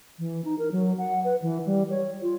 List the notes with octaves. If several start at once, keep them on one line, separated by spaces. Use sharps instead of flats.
E3
D#4
A#4
F#3
F#5
B4
E3
G3
C#5
F4